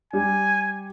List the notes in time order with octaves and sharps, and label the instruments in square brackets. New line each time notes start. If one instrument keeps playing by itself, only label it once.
[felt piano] G3 [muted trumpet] G#5